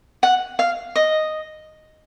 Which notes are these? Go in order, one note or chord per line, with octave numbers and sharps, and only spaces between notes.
F#5
F5
D#5